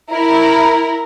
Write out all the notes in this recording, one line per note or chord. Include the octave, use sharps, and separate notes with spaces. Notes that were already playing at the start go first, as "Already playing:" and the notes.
E4 A#4